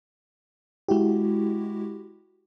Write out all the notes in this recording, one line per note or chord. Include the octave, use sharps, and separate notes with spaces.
G#3 E4 F#4 G4